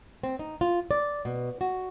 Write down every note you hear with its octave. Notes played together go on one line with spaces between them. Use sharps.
C4
D#4
F4
D5
B2
F#4